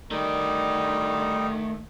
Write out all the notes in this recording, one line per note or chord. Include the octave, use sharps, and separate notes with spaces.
D#3 G3 A3 D#4 D5